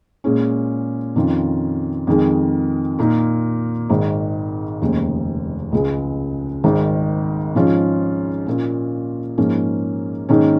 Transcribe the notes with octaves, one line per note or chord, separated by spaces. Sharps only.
A#2 G#3 C#4
F2 D#3 C#4 F4
F2 D#3 G#3
A#2 A#3 D#4
G#1 G#2 D#3
F1 D#2 C#3 G#3
C#2 C#3 G#3
G#1 G#2 D#3
G#2 F3 C#4 F4
A#2 A#3 C#4 F4
G#2 F3 A#3 C#4
G#2 D#3 A#3 C#4